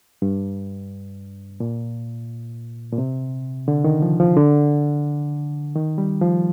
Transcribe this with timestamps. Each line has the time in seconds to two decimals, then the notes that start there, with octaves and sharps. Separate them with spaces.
0.22 G2
1.60 A#2
2.93 A#2
2.98 C3
3.68 D3
3.84 D#3
4.02 F3
4.20 F3
4.37 D3
5.75 D#3
5.98 G3
6.21 F3